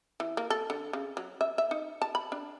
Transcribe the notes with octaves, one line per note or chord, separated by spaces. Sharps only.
E3
A#3
A4
D3
C#3
F#3
E5
E5
D#4
A5
B5
D4